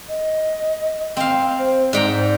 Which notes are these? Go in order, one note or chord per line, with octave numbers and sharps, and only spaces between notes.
D#5
C4 F5 G5
C5
G#2 D5 G5 A#5